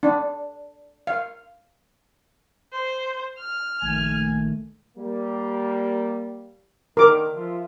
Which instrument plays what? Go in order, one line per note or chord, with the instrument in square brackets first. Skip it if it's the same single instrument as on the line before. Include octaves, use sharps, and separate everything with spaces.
[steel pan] D4
F5
[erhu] C5
F6
[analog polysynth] A#1 D#3 A3 [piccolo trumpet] G#5
[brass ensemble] G3 A#3
[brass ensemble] D3 D#3 [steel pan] A#4 D6
[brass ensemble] F3 F4 E5